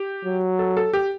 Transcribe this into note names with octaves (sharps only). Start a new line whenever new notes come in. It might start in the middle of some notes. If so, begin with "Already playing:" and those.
Already playing: G4
F#3
A4
A4
G4